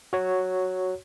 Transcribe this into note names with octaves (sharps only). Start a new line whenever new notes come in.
F#4 C#5